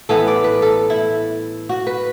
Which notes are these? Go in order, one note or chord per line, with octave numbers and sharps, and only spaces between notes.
A2 E3 B3 A4
D5
B4
A4
E4
F#4
B4